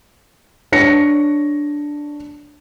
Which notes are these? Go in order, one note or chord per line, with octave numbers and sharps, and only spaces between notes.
D4 C#5 A#6 C#7